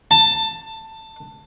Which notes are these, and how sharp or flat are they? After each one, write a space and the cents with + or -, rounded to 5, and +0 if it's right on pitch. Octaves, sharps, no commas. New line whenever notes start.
A5 +15